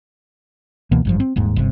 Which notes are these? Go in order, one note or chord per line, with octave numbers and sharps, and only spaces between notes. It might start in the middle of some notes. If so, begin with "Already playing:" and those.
C#2 B2 E3 A#3
G#1 G2 F3
C4
D#1 D#2 G#2
G1 C3